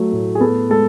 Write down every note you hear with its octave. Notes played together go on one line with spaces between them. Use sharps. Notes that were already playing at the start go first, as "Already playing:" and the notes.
Already playing: F#3 A3
A2
G#4
B3 A4
G#3 A4